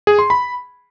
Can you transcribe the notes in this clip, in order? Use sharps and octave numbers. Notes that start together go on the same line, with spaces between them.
G#4
C6
B5